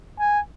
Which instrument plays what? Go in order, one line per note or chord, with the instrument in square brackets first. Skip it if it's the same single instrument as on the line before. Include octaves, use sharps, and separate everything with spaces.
[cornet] G#5